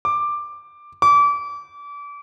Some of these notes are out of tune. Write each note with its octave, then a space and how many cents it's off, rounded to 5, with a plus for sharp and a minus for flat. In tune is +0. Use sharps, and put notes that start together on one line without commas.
D6 +10
D6 -30